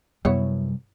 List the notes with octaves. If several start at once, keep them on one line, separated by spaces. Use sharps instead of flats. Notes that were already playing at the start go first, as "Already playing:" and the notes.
F#2 C3 G3 B3 E4 C#5